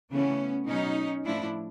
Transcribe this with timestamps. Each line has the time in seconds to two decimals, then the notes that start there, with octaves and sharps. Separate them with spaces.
0.10 C#3 E3 A3 B3 C#4
0.67 B2 F#3 B3 C#4 D#4
1.24 A2 F3 A3 D4 E4